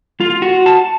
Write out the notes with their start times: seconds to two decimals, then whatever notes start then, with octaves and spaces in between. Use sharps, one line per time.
0.20 F4
0.42 F#4
0.66 A5